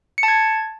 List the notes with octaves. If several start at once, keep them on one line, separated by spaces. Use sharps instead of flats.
C#7
A5
G#6